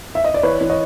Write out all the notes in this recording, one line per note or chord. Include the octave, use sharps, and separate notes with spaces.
E5
D#5
D5
E3 B4 C#5
E3
C#5 D#5